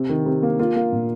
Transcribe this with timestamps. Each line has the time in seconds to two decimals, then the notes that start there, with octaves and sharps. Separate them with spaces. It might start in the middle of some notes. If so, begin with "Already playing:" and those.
Already playing: C3
0.09 D#3
0.26 C3
0.43 A#3
0.59 A#3 F4
0.76 A#3
0.92 A#2